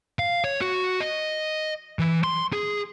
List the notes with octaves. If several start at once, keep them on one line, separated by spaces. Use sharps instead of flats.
F5
C#5
F#4
D#5
E3
C6
G#4